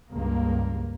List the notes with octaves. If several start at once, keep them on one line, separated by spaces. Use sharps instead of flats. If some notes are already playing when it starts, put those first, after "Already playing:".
C#2 G2 A#3